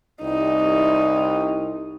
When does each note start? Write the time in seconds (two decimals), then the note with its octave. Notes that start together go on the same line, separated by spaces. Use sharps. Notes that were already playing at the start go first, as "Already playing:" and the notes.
0.22 C2 D#4